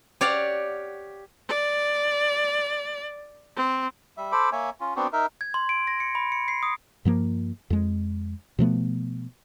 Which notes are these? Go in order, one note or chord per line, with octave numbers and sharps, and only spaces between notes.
G4 C#5 D5 F5 F#5
D5
C4
G3 E5
A4 C5 B5 D6
A#3 C#5 E5 G#5
C#4 F4
B3 C4 D4 F#4
D#4 A#4 E5
G#6
C6
D7
A#6
C#7
B5
C#7
C7
D#6
G2 F3 A#3
F2 G#3
B2 F3 A3 B3